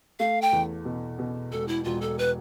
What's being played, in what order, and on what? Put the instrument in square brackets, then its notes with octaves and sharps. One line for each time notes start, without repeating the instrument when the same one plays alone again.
[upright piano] A3 [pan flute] F5
[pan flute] G5
[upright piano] E2
B2
B2
[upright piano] E1 [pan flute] A4
[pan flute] E4
[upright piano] E1 [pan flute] F4
[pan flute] A4
B4